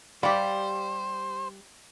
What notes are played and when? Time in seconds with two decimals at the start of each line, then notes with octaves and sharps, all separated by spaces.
0.23 G3 G4 C5 D5 F5 B5